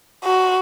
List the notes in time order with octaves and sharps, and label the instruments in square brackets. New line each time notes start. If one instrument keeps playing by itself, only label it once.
[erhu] F#4